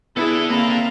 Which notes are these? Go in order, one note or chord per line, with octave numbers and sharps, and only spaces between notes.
B3 D4 E4 G#4 A4
A#3 C4 F5 A#5 B5